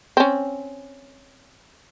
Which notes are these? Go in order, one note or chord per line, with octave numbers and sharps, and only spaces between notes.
C4 C#4